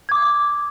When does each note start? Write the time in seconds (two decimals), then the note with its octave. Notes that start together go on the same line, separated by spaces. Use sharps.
0.09 G#6
0.12 D6
0.14 D#6